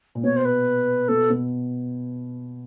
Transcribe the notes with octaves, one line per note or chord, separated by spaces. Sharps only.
A#2
B2 C#5
C5
B4
B2 A4
B2